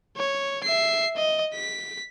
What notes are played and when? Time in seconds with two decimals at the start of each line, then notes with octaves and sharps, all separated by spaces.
0.17 C#5
0.63 E5 C7
1.16 D#5
1.54 B6